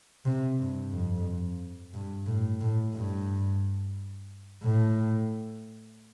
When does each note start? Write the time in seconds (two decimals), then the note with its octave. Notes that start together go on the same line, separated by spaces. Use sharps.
0.25 C3
0.59 G2
0.92 F2
1.94 G2
2.27 A2
2.61 A2
2.95 G2
4.63 A2